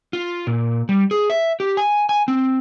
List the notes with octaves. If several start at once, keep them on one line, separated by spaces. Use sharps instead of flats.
F4
A#2
G3
G#4
E5
G4
G#5
G#5
C4